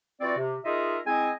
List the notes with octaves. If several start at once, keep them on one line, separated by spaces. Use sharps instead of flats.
E3 C4 F4 F#4 D5
C3
D#4 F4 G#4 A#4 D#5 E5
G#3 C4 E4 D#5 G#5